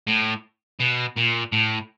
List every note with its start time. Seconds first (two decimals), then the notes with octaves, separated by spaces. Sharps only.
0.08 A2
0.80 B2
1.16 A#2
1.52 A2